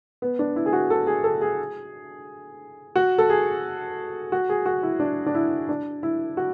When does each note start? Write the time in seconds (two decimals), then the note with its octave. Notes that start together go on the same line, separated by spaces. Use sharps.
0.22 B3
0.39 D4
0.56 E4
0.66 G#4
0.73 F#4
0.90 A4
1.07 G#4
1.24 A4
1.41 G#4
2.96 F#4
3.18 A4
3.30 G#4
4.32 F#4
4.49 G#4
4.66 F#4
4.83 E4
5.00 D4
5.26 D4
5.35 E4
5.69 D4
6.03 E4
6.37 F#4